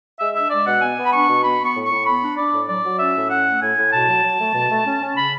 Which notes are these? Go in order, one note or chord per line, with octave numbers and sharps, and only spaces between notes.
G#3 E5
D4 E5
G#3 D5
B2 F#5
B3 G#5
B3
B5
D4 C#6
B2
B3 B5
B3
C#6
A2
C#6
A2
B3 B5
D4
D4 D5
A2
F#3 D5
F#3
C#4 E5
A2
C#4 F#5
A3
A2 G#5
A2
B2 A5
F#3
F#3
A3
B2
A3
C#4
C#4
C#3 B5